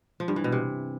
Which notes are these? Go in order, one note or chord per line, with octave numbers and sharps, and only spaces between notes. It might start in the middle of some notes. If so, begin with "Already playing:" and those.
F3
G2
E3
B2
C3